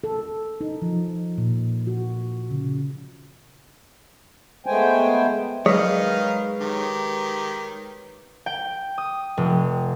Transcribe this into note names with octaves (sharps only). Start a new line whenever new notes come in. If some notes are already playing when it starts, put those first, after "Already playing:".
A4
D#4
F3
A#2
F#4
C#3
G#3 A3 B3 C5 G5 G#5
D#3 F#3 G#3 B4 C#5 D#5 F5
D#3 G4
G5
D#6
F1